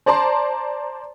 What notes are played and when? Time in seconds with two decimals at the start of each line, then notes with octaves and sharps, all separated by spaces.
0.06 C5 D5 A5 A#5 C6